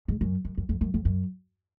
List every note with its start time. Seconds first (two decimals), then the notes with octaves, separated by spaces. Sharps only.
0.08 G#2
0.21 F#2
0.45 F#2
0.57 F#2
0.69 F2
0.81 F#2
0.94 F2
1.05 F#2